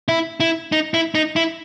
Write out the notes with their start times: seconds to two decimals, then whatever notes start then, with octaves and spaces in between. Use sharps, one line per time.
0.08 E4
0.40 E4
0.72 D#4
0.94 E4
1.15 D#4
1.36 E4